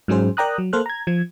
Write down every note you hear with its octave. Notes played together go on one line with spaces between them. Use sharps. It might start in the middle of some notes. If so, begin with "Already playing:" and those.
G#2 F#3 C#4 G#4 C5
A#4 D5 G5 A#5 D#6 F#6
F#3
A#3 A4 C5 F6 F#6
A#5 G#6
F3 G#6